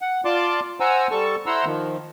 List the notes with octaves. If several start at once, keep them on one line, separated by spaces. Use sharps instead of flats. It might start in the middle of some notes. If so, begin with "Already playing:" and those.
F#5
F4 D5 A5 C6 D6
C5 F#5 G#5 A#5 E6
G3 A4 A5 C#6
E4 C5 F#5 A#5 C6 E6
D#3 F3